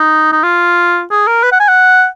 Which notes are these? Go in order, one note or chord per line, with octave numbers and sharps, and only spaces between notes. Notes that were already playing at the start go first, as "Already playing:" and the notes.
Already playing: D#4
D#4
F4
G#4
A#4
B4
F#5
G#5
F#5